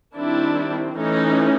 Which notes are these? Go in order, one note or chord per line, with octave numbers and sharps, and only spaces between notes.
D#3 G3 C4 D4 E4
E3 A3 C#4 D#4